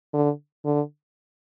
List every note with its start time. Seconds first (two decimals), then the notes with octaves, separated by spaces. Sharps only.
0.13 D3
0.65 D3